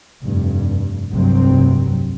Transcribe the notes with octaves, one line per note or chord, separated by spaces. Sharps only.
F1 G2
F1 C2 G2 C3 F#3 C4